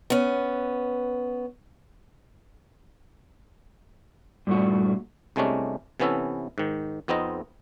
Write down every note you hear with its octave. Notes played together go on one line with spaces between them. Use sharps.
B3 C#4
G2 A#2 A3 F#4
C2 C3 G#3 A3 C#4 D4
C3 E3 B3 C#4 E4 A4
G#2 D#3
F2 B3 C4 D#4 D#5